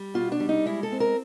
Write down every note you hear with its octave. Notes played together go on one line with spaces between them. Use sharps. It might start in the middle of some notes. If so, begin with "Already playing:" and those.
Already playing: G3
B2 F4
D4
G3
D#4
G#3 E4
A4
C4
A#4